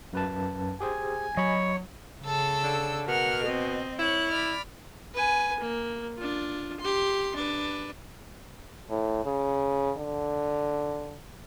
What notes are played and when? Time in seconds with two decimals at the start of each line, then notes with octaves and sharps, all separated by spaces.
0.13 F#2 B4 A5
0.80 G4 G#4 C5 G#5
1.37 F#3 C#5 D#5 B5
2.22 C#3 A4 E6
2.63 D3
3.07 B2 A#4 F#5 F6
3.44 C4 D#5
3.99 E4 C#5 F#6
4.32 D5 B5 F6
5.14 B4 G#5
5.59 A#3
6.18 D4 F4
6.79 G4 C6
7.35 D4 B4
8.90 A2
9.25 C#3
9.97 D3